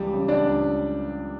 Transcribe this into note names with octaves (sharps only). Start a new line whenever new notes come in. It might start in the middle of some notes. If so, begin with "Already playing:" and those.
Already playing: C#2 E3 G3 G4
C#3
D4 D5
C#2